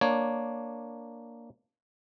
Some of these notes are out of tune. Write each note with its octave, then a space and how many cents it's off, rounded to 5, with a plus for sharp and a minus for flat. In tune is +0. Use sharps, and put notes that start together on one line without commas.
A#3 +0 D4 +0 C#5 +0